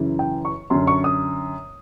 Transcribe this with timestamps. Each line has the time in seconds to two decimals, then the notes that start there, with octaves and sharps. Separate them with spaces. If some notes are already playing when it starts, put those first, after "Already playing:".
Already playing: F#2 C#3 E3
0.19 G5
0.45 C#6
0.70 F#2 D3 C6
0.87 C#6
1.04 D#6